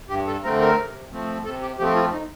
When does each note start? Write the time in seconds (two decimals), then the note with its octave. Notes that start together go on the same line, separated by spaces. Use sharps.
0.10 G2 G4
0.27 A4
0.44 D3 A3 C4 A#4
0.60 A#4
0.78 C3
1.11 F3 A3 C4
1.45 C3 A4
1.62 G4
1.79 F3 A3 C4 G4
1.95 F4
2.13 D#4